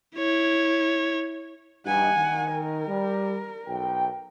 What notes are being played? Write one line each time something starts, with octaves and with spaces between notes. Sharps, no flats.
E4 C#5
G2 D#4 F#5 G#5
D#3
A#4
G3
B1 G5